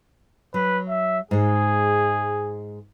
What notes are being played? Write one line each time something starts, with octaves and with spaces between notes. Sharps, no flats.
F#3 B4
E5
G#2 G#3 G#4